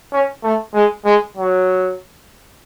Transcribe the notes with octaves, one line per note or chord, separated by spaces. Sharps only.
C#4
A3
G#3
G#3
F#3